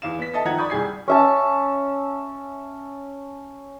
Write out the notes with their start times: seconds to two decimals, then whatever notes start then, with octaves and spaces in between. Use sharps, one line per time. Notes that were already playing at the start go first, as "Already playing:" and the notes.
0.02 E2 F5 E7
0.19 B3 B6
0.33 A4 D#5 E5 A5
0.45 D#3 F3 F#5 A#5 G#6
0.58 D5 B5 C#6 D#6 G6
0.70 C2 G3 G#4 G#6 C7
1.08 C#4 E5 A5